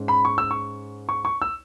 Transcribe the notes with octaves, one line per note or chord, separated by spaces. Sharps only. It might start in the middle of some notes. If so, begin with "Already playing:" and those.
Already playing: G#2 C#4
B5
C#6
E6
C#6
C#6
C#6
E6